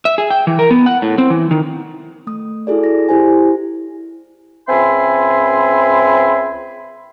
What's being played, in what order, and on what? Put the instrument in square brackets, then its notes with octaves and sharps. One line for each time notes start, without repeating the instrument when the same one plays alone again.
[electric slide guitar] E5
G#4
G5
E3
A#4
B3
F#5
A2
C4
E3
D#3
[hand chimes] A3 D#6
E4 F#4 G#4 A4 D5
A#6
E4 G4 C5 G#5
[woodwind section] C#2 C4 E5 G#5 B5 C6